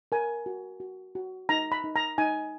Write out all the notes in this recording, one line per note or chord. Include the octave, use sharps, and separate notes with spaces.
A#4 G#5
F#4
F#4
F#4
D#4 A#5
B5
D#4
A#5
D#4 G#5